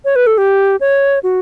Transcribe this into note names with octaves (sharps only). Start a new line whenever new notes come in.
C#5
B4
A4
G4
C#5
F#4